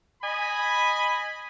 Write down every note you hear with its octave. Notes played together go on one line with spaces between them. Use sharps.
D#5 G#5 B5